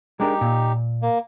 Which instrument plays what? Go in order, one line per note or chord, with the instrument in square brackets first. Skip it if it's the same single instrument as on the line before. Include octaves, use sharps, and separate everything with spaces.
[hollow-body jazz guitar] G#3 D4 A#4 [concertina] D#4 G4
[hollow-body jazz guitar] A#2
[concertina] A#3